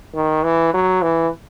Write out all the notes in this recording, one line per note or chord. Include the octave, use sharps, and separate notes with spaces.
D#3
E3
F#3
E3